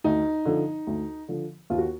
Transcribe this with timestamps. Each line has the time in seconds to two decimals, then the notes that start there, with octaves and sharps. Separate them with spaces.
0.04 D2 D#4
0.45 D3 F3
0.87 D2
1.28 D3 F3
1.70 D#2 F4
1.78 F#4